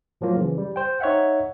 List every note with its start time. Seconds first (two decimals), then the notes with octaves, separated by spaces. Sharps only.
0.21 A2 F3 F#3 A#3 F4
0.36 C#3 E3
0.58 G3
0.76 C5 G5
1.00 D#4 C#5 E5 F#5